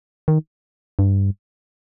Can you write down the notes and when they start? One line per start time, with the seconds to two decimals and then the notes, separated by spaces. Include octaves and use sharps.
0.28 D#3
0.99 G2